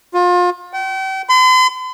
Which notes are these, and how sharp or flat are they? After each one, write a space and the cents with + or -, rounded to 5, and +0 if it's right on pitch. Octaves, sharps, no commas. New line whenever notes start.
F4 +30
G5 -40
C6 -45